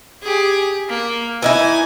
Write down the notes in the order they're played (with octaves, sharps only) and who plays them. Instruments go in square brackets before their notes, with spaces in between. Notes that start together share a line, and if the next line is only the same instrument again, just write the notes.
[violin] G4 G#4
A#3
[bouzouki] E3 D#4 E4 [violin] G#5